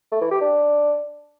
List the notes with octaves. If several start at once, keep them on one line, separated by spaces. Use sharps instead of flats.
A3
E3
G4
D4